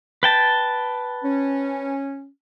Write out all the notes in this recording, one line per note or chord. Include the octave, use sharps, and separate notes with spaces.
B4 G5 A5
C#4